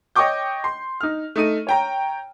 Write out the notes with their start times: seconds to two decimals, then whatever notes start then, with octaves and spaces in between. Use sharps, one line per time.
0.16 C#5 D#5 G5 C#6 D6 G6
0.64 C6
1.01 D#4 F6
1.36 A3 D#4 D#7
1.67 C#5 G5 A#5